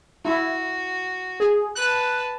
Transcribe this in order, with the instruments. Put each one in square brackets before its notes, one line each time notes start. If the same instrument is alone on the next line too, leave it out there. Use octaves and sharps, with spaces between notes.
[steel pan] E4 [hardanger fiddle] F#4
[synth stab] G#4
[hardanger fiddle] B4 A5 [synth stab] F#6